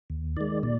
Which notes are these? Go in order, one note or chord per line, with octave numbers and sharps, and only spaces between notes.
D#2
D#3 G#3 D5
A#2 D5